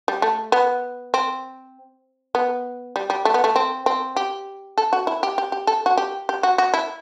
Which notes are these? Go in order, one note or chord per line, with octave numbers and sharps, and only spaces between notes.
G3
A3
B3
C4
B3
G3
G3
A3
B3
A3
C4
C4
G4
A4
F#4
E4
G4
G4
G4
A4
F#4
G4
G4
F#4
F#4
E4